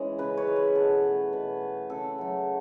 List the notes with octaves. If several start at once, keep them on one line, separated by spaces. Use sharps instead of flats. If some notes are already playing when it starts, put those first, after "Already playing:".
Already playing: E3 G#3 C#4
C#3 B4
C#5
E3 G#3
B4
B2 A4
A3
B2 B4
A3
C#3 A4
F#3 A3